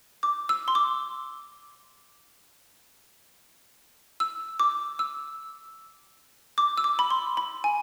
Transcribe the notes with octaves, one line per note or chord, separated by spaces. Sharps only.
D6
E6
C6
D6
E6
D6
E6
D6
E6
D6
B5
C6
B5
G#5